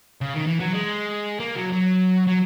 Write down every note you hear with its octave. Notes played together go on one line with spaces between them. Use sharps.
C#3
D#3
E3
F#3
G#3
A#3
F#3
F#3
F#3